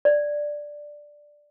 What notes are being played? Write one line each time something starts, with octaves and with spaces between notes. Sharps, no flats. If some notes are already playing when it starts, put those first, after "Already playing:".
D5